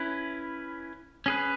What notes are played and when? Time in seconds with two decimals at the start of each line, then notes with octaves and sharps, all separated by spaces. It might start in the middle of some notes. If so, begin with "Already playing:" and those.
Already playing: C#4 E4 B4
1.26 C#4 G#4 B4